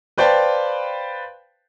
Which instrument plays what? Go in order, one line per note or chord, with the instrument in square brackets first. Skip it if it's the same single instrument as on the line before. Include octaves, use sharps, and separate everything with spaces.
[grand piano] B4 C5 D5 F5 G5 A5